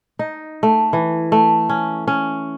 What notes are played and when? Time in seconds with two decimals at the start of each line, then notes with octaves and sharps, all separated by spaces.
0.19 D#4
0.63 A3
0.93 E3
1.32 A3
1.69 C#4
2.08 C#4